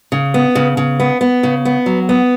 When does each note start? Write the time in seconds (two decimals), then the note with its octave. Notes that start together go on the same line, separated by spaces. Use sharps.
0.12 C#3
0.34 B3
0.55 C#3
0.77 C#3
1.00 B3
1.21 B3
1.43 C#3
1.65 B3
1.86 F#3
2.09 B3